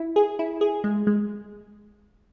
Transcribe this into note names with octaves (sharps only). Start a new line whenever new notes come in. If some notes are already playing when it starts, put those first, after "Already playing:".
Already playing: E4
G#4
E4
G#4
G#3
G#3